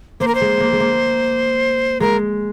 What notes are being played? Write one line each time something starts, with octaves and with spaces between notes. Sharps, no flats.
A#3 C5
A#4
C5
G#3
A#3
G#3
A#3
G#3 A#4